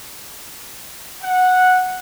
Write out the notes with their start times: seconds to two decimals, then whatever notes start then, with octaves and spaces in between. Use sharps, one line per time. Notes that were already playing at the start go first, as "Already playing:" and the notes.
1.23 F#5